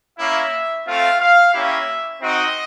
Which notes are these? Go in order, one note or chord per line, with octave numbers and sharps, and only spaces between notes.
A#3 C#4 E4 E5
A3 C4 F4 F5
F5
A#3 C#4 E4 G4 E5
C4 D#4 F#4 D#5